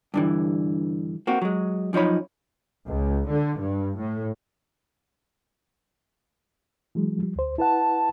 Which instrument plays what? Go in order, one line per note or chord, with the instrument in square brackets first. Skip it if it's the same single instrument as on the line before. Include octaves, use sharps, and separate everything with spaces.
[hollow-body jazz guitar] G2 D3 E3
A#3 C4 F#4
F#3 G#3
F#2 F3 D#4 C#5 B5
[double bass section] C#2
D3
G2
A2
[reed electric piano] E3 F#3 G#3
F3 G3
D2 C5
[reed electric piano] E4 B4 F#5 [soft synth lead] A5